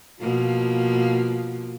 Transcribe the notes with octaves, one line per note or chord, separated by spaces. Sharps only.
B2 F3 A#3